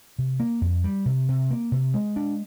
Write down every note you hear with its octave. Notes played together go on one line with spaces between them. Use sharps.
C3
A#3
F2
G3
C3
C3
A#3
C3
G#3
D4